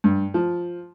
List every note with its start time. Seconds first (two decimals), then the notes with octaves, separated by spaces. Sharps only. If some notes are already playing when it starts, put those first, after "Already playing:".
0.04 G2
0.34 F3